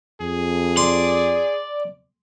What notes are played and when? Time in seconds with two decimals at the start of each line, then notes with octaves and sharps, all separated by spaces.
0.21 F2 G#4
0.77 D5 C6